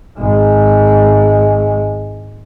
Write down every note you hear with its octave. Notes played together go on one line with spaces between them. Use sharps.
G#1 G#3